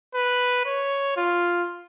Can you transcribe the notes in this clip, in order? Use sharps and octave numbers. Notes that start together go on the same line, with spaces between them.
B4
C#5
F4